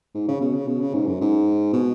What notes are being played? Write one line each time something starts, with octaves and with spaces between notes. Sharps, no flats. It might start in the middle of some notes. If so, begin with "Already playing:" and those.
G#2
C#3
B2
C#3
B2
C#3
G#2
F#2
G#2
B2